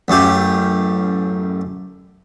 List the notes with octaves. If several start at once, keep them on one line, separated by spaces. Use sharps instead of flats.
A1 F#2 A3 G4